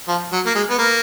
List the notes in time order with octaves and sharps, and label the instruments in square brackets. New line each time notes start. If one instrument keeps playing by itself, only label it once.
[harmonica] F3
F#3
A#3
G#3
B3
A#3